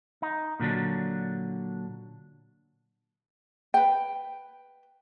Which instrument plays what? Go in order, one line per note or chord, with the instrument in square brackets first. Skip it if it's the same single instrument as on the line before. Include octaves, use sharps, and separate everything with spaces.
[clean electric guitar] D#4
A#2 D3 F#3 D4
[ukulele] B4 G5